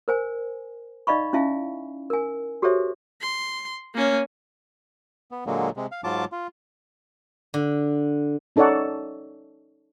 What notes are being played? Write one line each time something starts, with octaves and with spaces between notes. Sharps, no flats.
A#4 C5 G#5
D#4 D5 D#5 F5 B5 C#6
C#4 E4 E5 F5 G#5
A#4 G#5
F#4 G4 A4 C5 C#5 E5
C6
A#3 C#4
B3
A#2 D3 F#3 G#3 A#3
C3 G#3
F5
G#2 F#3 F4 A5 D6
F4
D3
C#4 D#4 A4 C#5 D5 F#5